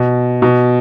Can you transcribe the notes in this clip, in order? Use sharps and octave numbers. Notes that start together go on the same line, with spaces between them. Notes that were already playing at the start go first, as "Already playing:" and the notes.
Already playing: B2
B2